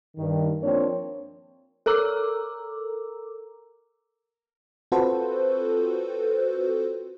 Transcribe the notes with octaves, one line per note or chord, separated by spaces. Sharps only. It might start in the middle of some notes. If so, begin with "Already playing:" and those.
G2 D#3
F3 A#3 C4 D4 C#5
A4 A#4 A#5 D6 E6
C4 F4 F#4 A4 B4 C5